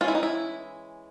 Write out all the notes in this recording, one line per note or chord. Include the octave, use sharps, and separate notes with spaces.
E3 G#3 C#4 F4
E4
D#4
E4